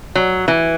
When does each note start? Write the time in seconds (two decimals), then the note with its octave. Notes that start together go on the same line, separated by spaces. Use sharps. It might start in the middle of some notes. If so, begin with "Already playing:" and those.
0.15 F#3
0.48 E3